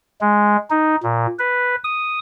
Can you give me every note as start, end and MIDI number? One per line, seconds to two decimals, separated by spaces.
0.21 0.57 56
0.70 0.96 63
1.03 1.27 46
1.39 1.76 71
1.84 2.19 87